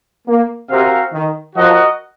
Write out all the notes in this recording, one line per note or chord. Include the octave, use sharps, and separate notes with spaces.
A#3
C3 C4 F#4 A#4 F5
D#3
F3 F#4 A#4 D#5 F#5